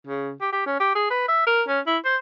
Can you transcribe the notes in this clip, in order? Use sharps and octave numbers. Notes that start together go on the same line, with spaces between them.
C#3
G4
G4
C#4
G4
G#4
B4
E5
A#4
C#4
E4
C5